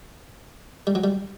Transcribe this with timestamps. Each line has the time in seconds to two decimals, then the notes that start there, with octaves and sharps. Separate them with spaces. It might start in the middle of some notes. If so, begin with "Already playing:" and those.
0.87 G3
0.95 F#3
1.04 G3